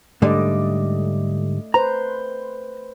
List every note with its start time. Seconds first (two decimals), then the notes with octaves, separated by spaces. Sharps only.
0.22 G#2 D3 G3 A3 D5 D#5
1.74 B4 C5 A#5